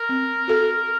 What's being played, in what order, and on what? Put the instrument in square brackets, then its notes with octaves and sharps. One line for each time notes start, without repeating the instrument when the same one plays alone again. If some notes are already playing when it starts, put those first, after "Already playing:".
Already playing: [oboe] A#4
[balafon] C4
F#4 A4